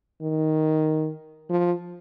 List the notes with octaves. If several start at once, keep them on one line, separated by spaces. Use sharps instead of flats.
D#3
F3